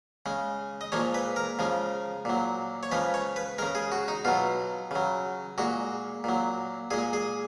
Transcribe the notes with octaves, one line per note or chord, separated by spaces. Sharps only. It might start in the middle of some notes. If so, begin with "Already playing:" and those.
C#3 G#3
D#5
A#2 F3 G#3 C#5
B4
A#4
C#3 F3 G#3
A#2 F#3
C#5
C#3 F3 G#3 B4
C#5
B4
C#3 G#3 A#4
G#4
F#4
D#4
B2 F#3 F4
C#3 F#3
A#2 G#3 F#4
A#2 F#3
A#2 G#3 G#4
G#4